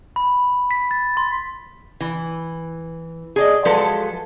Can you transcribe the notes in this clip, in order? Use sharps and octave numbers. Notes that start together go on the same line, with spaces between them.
B5
B6
A6
C6
E3
G#4 D5 D#5
F3 F#3 G#3 A4 B4